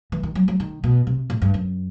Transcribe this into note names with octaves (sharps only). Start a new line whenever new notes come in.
E3
D#3
F#3
F#3
D#3
B2
C3
A2
G2
F#2